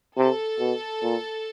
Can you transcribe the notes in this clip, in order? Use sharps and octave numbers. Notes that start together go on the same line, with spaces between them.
C3 A4
B2
A#2